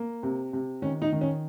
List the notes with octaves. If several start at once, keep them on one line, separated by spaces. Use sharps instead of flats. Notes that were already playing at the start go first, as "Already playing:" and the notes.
Already playing: A#3
C3
C3
D#3 C#4
D#4
D#3
C#4